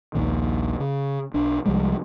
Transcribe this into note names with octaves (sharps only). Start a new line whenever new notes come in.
A#1 D#2 A#2 D#3
C#3
B1 D4
C2 F3 G3 G#3